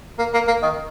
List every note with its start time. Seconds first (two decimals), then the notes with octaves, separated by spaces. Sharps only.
0.19 A#3
0.34 A#3
0.48 A#3
0.63 D#3